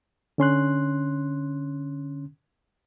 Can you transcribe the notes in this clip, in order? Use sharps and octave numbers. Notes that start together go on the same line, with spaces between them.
D3 C#4 C6 F#6